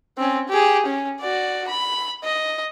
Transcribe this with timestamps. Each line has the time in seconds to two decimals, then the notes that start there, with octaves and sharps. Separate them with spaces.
0.18 C4 C#4
0.49 G4 G#4
0.86 C#4
1.20 F#4 D5
1.68 B5
2.24 D#5